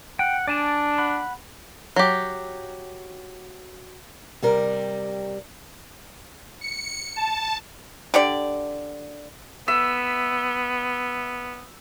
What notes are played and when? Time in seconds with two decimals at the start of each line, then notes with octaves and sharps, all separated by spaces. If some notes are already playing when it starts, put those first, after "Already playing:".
0.19 F#5 G5
0.48 D4 D5 G#5 A5
0.98 F#5 B5
1.96 F#3 G4
4.42 C3 G3 A#4
6.61 C#7
7.16 A5
8.14 D3 G4 D5
9.68 B3 E5